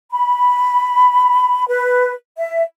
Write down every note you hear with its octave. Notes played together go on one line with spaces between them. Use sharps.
B5
B4
E5